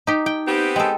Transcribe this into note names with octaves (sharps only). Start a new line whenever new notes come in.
D#4 G4
D#4 G5
B3 C4 G4
G#3 A4 G5